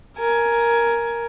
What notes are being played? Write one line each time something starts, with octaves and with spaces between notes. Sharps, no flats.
A#4 G#5